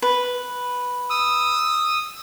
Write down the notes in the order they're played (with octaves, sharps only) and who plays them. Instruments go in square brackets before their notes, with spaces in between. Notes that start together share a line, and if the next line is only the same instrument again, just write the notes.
[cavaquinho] B4
[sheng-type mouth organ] D#6 E6